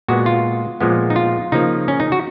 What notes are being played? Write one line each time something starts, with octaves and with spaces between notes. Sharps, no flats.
A#2 G#3 B3 F#4
F4
A#2 F3 G#3 B3
D#4
F4
C#3 F3 A#3 D#4
C#4
D#4
F#4